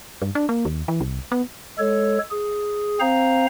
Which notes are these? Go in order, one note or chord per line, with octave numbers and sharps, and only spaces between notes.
G2
D4
A#3
D#2
E3
C2
B3
G#3 A4 C#5
G#4
C4 C5 F5 A#5